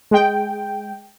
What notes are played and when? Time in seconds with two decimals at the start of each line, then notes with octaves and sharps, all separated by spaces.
0.11 G#3 G5